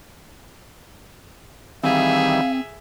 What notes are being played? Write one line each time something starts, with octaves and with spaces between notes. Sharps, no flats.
D#3 E3 G3 C4 G#4 E5 F5